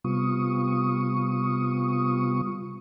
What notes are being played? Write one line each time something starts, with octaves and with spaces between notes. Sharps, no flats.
C3 G3 B3 F4 C#6 D#6